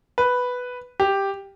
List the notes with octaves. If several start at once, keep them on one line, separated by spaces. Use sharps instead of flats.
B4
G4